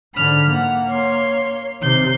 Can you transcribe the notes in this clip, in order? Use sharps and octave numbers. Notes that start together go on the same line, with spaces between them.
G#2 D3 B5 F6
A#3 F#5
C#5 C6
C3 D#3 G6 C7